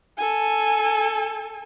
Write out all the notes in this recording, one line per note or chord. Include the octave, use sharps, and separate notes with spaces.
A4 G#5